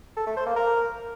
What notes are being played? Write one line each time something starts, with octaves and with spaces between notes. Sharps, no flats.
A4
A3
C5
A#3
A#4